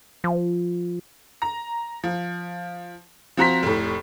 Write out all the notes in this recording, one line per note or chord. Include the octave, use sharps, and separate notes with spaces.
F3
A#5
F3
F3 C4 F#4 A#5 C6 B6
F1 A2